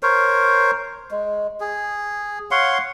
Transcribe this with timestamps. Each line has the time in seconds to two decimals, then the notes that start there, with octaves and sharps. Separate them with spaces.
0.03 A#4 C5 C#5
1.11 G#3
1.60 G#4
2.51 C#5 F5 F#5 C6